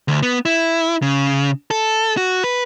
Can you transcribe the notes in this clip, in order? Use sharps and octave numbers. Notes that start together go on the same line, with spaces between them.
D2
B3
E4
C#3
A4
F#4
B4